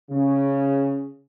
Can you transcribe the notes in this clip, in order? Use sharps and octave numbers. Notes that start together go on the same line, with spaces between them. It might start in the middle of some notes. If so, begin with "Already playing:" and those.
C#3